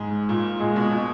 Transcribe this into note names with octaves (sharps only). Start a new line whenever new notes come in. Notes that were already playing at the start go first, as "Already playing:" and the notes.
Already playing: G#2 G#3
A#2
A#2 G#3
B2
B2